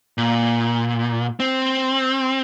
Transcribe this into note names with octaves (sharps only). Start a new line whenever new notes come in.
A#2
C4